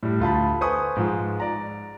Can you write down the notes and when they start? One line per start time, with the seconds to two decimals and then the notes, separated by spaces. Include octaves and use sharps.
0.03 A2 G3
0.20 D2 F4 A5 B5
0.61 B4 C5 G#5 C#6 D#6
0.97 G#2 F3 G#3
1.40 D5 A#5